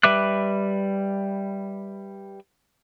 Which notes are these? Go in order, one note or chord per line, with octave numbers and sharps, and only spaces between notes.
G3 B4 E5 D6 F#6